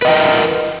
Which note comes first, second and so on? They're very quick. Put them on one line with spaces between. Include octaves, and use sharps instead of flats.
B4 D#5 G5 A#4